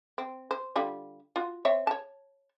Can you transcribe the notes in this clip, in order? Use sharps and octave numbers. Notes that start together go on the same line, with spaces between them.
C4
C5
D3 G3 F4
F4 F#4
C4 C#5 E5
C#5 A5